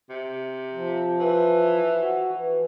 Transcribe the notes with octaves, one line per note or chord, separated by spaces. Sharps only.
C3
F3
E3
F#4
E3